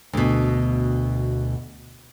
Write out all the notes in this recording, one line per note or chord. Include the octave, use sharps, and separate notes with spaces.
D2 B2